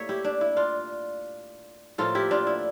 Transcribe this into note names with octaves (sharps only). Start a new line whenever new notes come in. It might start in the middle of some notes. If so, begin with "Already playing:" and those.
Already playing: A2 G3 A#3 C#5 E5
E4 G4
D4
E4
D4 F4
A2 F3 A#3 F4 A4
E4 G4
D4 F4
E4